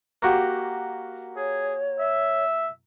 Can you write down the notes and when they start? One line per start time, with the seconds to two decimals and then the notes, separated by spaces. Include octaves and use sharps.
0.22 A#3 F#4 G4
1.36 G#4 C#5
1.99 E5